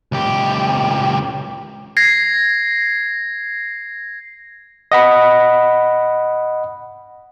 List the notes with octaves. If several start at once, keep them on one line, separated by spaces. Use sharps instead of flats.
C#2 G4
G#6 A#6 C7
D#5 F#5 B5